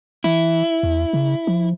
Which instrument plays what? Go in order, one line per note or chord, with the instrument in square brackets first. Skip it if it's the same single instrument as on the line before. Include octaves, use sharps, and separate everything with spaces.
[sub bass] E3 [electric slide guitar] E4
[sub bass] E2
C#3
F3